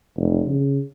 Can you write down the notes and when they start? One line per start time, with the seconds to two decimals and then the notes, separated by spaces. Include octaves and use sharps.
0.17 F1
0.47 C#3